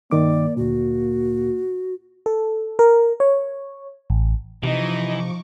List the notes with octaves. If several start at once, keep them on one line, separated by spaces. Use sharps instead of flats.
G2 D#3 A#3 D5 D6
D2 A#2 F#4
A4
A#4
C#5
A1
C3 E3 F3 D#4 D#5 C#6 D6